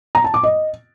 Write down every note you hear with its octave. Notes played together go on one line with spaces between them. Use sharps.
A#5
A5
D6
D#5